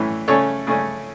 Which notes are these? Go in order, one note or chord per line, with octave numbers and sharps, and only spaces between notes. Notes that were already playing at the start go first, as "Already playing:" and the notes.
Already playing: A2 E3 C#4
C#3 A3 C#4 A4 C#5
C#3 A3 C#4